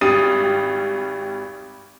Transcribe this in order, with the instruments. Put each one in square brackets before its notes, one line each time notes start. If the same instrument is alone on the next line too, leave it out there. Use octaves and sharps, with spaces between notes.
[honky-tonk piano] G#1 G3 D#6 A6 D#7